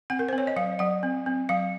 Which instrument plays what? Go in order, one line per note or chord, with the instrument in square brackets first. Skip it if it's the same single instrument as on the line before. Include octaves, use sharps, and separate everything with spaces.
[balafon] C4 F#5
A#4
C5
C4
C#5
D#5
F#3 F5
F#3 F#5
C4
C4
F#3 F5